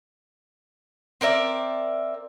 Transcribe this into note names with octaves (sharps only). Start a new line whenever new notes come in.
C4 A#4 D5 E5